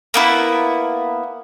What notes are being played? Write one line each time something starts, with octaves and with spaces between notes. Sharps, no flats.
A#3 B3 E4